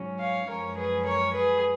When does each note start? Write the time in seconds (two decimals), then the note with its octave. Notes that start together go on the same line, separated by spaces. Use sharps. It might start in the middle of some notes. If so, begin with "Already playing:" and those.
Already playing: G#2 F#3 C#4
0.20 C#5 F5
0.49 F#2 F3 G#3 C#4 A#4 C#5
0.78 G#4 B4
1.06 A#4 C#5
1.34 G#4 B4